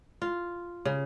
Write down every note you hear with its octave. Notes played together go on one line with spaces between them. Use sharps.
F4
C#3